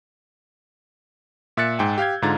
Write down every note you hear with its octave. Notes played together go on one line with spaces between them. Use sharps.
A#2 E5 E6 F#6 A6 C#7
G#2 G5 G#5
G4 F5 G6 G#6
G#2 D3 F4 A#5 G#6 A6